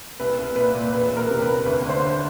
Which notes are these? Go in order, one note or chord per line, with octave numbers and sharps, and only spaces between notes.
C2 B4
C2
A#2 B4
A#2
E1 B4
E1
A#4
C3
B4
E1
D2 B4
D3
C5
D3